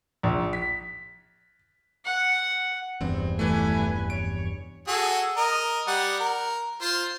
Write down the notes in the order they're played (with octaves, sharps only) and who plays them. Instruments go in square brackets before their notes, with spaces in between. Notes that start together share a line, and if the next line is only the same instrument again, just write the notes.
[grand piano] A#1
B6
[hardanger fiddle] F#5
[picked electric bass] F1 E2 G2 [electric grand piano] C4
[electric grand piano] E3 A3 [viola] B4 G#5
[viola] C#5 [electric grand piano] D7
[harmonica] F#4 G#4 A4
A#4 D#5
G3 F#5
A#4
F4 C5